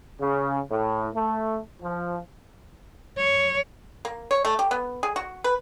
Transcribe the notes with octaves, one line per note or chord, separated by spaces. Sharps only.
C#3
A2
A3
F3
C#5
A#3
C#5
A3
G4
B3
G#4
F#4
B4